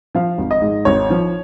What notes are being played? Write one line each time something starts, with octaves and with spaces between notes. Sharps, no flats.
F3 F5
G#1
D#5
G#2
G#1 C#5
F3